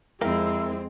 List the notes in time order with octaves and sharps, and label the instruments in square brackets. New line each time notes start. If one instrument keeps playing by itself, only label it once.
[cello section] F2 C4 [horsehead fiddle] G#3 [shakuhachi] E4 [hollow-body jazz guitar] A#4 F5 G5